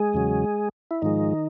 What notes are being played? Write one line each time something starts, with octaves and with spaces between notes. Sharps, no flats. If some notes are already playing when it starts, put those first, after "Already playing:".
Already playing: G#3 G#4
E2 C#3 F#3
E4
G#2 D#3 F3 G#3 D#4